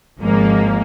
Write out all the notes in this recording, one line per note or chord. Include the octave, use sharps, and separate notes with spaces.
G#1 G#2 F3 A#3